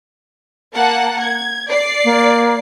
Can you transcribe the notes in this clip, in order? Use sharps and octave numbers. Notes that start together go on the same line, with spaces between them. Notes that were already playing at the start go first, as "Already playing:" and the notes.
A#3 F#5 A5
G#6
D5 C7
A#3